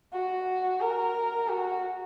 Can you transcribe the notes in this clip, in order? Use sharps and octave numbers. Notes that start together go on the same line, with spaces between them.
F#4
A#4
F#4